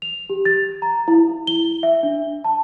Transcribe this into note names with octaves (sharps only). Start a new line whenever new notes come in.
F7
G4
A6
A#5
E4
G7
E5
D4
A5